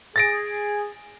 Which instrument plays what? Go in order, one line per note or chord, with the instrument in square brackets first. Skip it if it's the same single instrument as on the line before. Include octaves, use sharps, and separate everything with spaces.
[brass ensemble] G#4 [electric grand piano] A6 A#6 D7